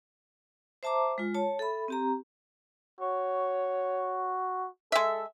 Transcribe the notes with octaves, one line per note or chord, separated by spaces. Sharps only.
C5 E5 A5 A#5 D6
G#3 F4
C#5 A5
A4 E5 B5
C4 G4 A#5
F#4 C#5
G#3 A4 E5